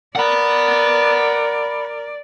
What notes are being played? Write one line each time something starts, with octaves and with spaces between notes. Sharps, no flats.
A#4 D5 F#5 B5